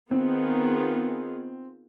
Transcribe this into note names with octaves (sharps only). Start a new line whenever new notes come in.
D#3 B3 C4 F4 G#4